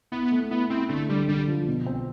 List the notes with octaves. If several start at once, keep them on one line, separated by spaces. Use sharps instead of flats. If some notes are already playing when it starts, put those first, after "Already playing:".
B3 E4
A3
B3 E4
C4 E4
D3 A3
D3 G3
D3 G3
F3
B2
C4